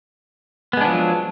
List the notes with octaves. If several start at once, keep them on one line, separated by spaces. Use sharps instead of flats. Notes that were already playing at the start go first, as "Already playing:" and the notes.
F3 F#3 G#3 B3 D4